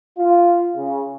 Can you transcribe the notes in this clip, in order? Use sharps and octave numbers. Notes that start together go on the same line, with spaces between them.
F4
C#3